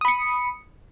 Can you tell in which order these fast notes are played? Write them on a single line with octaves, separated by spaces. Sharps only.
D#6 B5 C#7